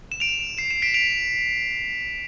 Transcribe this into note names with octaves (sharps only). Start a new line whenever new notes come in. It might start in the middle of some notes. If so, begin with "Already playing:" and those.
E7
D7 F7
C7 E7
C7 E7
B6 D7
D7 F7